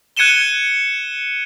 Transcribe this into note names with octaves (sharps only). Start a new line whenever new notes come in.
F#6 G#6 C#7 D#7 E7 G7